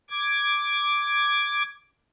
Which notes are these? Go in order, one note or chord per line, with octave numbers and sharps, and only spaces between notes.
D6 G#6